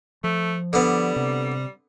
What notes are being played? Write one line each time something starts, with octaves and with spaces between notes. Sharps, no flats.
F3 A3
D3 G3 B3
C3